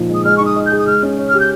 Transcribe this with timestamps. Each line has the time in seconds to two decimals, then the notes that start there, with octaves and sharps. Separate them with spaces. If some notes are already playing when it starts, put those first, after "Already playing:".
Already playing: A#2 F3 D#4
0.09 G#3
0.15 D#6
0.24 G#3 F6
0.37 C#6
0.40 D#4
0.46 D#6
0.56 D#5
0.66 G6
0.72 G#4
0.79 D#6
0.87 G#3 F6
1.03 C#4
1.18 C#5
1.29 G4 F6
1.40 G6